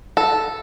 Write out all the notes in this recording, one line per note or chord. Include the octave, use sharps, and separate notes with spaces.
A4